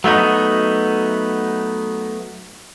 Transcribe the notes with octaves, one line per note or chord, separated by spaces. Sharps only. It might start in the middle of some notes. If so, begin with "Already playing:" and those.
F#3 A3 B3 D#4